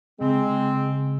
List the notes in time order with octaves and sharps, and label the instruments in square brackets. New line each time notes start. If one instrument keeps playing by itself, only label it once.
[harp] C#3 [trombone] G#3 [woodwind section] C4